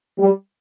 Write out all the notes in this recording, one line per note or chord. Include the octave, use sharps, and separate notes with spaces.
G3